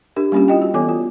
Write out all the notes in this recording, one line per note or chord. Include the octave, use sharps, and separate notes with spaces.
D4 G4 A#4
G3 A#3 C#4 F4 G4
E4 F4 D#5 G5
F#4
E3 B3 A4 C#5 G#5 D6
F4